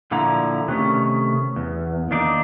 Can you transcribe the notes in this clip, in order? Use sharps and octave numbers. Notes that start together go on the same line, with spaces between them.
A#2 D3 F3 E4 A#5
C3 D#3 A3 C#4
E2
D#3 A#3 D4 D#4 D5